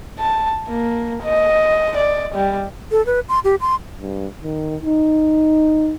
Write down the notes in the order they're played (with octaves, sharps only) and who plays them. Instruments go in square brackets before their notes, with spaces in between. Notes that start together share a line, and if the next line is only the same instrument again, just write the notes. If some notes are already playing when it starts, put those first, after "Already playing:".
[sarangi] A5
A#3
D#5
D5
G3
[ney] A4
B4
C6
G4
C6
[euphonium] G2
D#3
D#4